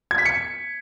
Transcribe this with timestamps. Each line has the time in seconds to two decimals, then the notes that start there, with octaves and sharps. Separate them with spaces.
0.11 G#6
0.18 B6
0.25 C#7